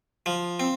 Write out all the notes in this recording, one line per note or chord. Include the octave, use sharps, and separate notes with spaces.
F3
C4